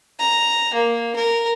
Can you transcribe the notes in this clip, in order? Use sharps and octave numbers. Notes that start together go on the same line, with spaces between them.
A#5
A#3
A#4